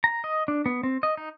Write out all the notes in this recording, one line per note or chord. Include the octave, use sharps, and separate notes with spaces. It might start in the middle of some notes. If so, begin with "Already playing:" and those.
A#5
D#5
D4
B3
C4
D#5
D#4